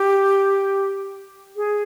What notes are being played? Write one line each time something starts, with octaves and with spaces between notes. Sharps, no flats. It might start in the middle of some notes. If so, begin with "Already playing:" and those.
Already playing: G4
G#4